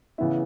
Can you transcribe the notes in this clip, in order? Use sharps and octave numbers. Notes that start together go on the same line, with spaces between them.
C#3 E3 B3 E4 E5